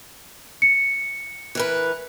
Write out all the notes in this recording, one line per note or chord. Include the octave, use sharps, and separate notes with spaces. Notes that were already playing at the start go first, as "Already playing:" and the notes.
C#7
E3 A#4 B4